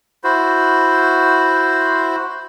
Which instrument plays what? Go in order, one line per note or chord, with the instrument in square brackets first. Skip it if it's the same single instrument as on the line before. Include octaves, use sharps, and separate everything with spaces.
[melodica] E4 F#4 C5